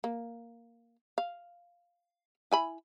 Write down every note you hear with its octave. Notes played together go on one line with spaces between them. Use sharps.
A#3
F5
E4 G#5 B5